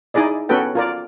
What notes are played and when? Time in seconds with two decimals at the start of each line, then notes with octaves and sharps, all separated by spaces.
0.14 D#4 E4 G#4 D5 D#5
0.49 B3 C#4 F#4 A4 B4 G5
0.75 F4 A#4 D5